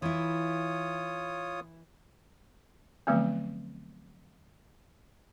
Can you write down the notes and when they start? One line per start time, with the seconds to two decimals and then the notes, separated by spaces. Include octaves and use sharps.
0.02 E3 E4 F4 C#5 D#6
3.07 D3 F3 F#3 A3 B3 C4